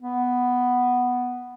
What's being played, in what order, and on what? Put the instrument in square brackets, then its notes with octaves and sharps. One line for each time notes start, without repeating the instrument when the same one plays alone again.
[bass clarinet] B3